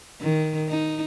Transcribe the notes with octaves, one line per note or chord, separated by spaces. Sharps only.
D#3
D#4